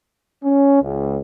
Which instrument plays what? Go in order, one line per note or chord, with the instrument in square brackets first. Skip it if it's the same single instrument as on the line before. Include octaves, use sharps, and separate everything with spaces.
[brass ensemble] C#4
C#2